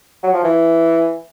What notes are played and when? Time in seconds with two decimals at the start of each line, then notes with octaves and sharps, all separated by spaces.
0.23 F#3
0.33 F3
0.43 E3